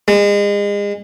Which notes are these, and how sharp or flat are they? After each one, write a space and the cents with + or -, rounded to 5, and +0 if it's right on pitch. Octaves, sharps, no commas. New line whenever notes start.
G#3 -35